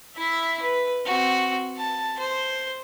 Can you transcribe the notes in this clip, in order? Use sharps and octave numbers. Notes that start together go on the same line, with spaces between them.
E4 E5
B4
C4 F#4
A5
C5